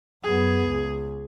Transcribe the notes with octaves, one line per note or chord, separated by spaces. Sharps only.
F#2 B3 G#4
C#2